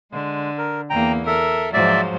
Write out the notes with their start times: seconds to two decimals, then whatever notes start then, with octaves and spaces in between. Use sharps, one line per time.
0.12 D3 G#3
0.58 A#4
0.90 E2 A#3 G5 A#5
1.27 A4 A#4 E5
1.73 G#2 F3 F#3 D5 E5